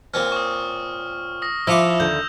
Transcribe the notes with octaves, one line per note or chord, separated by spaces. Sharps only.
A#2 C4 C#4 F6
C#6 D#6
D#6 A#6
F3 E4 F4 C#6 D6 E6 E7 F7
D#2 D3 G6